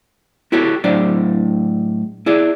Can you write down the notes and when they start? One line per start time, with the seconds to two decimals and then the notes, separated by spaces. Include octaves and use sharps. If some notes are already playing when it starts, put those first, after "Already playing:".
0.52 E4 F#4 G4 A4 C#5
0.84 A2 F#3 D4 C5 D5
2.26 E4 G#4 D5